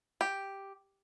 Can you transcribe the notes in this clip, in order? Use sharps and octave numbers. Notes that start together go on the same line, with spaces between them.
G4